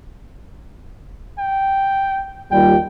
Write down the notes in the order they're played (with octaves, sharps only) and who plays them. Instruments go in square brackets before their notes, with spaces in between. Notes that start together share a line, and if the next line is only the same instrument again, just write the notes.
[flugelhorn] G5
[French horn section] D#2 G3 F4 [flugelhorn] G5